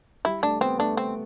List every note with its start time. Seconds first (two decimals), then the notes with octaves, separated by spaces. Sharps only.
0.25 G3 E4
0.43 A3 D4
0.61 B3 C4
0.79 A3 D4
0.97 C4